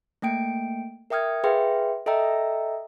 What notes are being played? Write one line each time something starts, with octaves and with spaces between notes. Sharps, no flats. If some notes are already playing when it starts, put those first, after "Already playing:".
A3 A#3 G5 D7
A#4 E5 G5 D#6 F6 G#6
G#4 B4 E5 F5 G5 C6
A4 D#5 E5 G5 A#5 E6